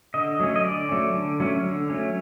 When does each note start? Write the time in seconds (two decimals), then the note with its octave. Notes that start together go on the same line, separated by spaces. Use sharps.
0.14 D3 D#5
0.40 F#3 A3 C#4
0.56 D#5
0.65 D3 D5
0.89 F#3 A3 C#4
1.14 D3
1.40 F#3 A3 C#4
1.64 D3
1.90 F#3 A3 C#4